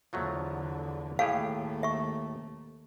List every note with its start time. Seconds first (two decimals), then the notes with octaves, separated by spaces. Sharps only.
0.13 E2 D3 F3 F#3 A3
1.19 D#2 A2 A3 G4 G#4 F5
1.83 E5 C#6